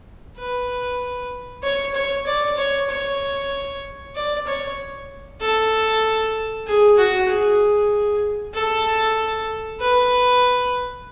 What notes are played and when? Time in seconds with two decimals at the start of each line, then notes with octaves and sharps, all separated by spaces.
0.38 B4
1.63 C#5
1.95 C#5
2.27 D5
2.58 C#5
2.90 C#5
4.15 D5
4.47 C#5
5.41 A4
6.67 G#4
6.98 F#4
7.29 G#4
8.54 A4
9.81 B4